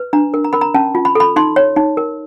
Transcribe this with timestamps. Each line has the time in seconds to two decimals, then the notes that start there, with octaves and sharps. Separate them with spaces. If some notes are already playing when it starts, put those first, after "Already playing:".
Already playing: B4
0.13 D4 A#5
0.34 A#4
0.44 A#5
0.53 A#4 B5
0.61 A#5
0.74 C#4 A5
0.95 F4
1.05 B5
1.15 A4 B5
1.36 D#4 C6
1.56 C#5
1.76 D#4
1.97 A#4